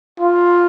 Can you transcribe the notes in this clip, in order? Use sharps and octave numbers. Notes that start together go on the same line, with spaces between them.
F4